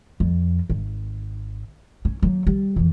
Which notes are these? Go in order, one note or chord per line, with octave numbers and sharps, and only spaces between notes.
F2
G#1
C#4
F#3 A#3
G3
F2 E3